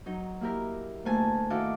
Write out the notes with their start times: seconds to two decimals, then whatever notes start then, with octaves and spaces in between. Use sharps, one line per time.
0.06 F#3 D#4
0.41 A#3 E4 G4 A#4
1.05 D2 A3 A#3 G#5 A5
1.50 D#3 E4 F#4 A4 F5 D6